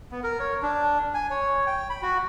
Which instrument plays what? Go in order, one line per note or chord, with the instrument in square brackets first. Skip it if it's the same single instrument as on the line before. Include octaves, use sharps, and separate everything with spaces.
[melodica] B3
A#4
C#5
D4
G#5
C#5
G5
B5
F#4